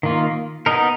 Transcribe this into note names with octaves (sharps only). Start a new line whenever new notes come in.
D#3 A#3 F4
B3 D#4 A#4